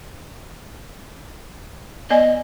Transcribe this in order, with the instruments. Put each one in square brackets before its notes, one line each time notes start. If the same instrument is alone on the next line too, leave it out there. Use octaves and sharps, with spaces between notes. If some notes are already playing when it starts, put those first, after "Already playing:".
[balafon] B3 D5 G#5 [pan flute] D#5